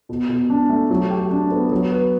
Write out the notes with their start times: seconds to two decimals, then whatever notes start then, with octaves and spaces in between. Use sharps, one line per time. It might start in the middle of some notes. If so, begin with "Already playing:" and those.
0.09 B2
0.29 B2
0.50 D4
0.69 A3
0.90 F#3
1.10 G4
1.31 D4
1.51 B3
1.71 F#3
1.92 B4